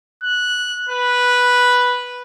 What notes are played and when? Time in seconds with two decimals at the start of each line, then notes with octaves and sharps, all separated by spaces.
0.24 F#6
0.89 B4